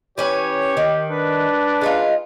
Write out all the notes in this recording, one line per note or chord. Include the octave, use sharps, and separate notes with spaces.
E3 C#4 G4 B4 C#5
D#3
D4 B4
G#3 D#4 F4